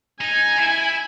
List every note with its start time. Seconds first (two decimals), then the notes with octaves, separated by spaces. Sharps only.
0.21 D#4 G#5
0.58 E4